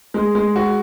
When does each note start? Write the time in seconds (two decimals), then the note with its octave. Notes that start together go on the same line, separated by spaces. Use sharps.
0.14 G#3
0.35 G#3
0.56 F#4